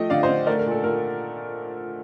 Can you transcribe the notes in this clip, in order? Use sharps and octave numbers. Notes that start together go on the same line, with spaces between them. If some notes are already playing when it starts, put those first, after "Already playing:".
Already playing: F3 A3 D#5 G5
D3 D5 F5
C5 D#5
D3
A3 A#4 D5
A#4
A#2 A4
A#2 A#4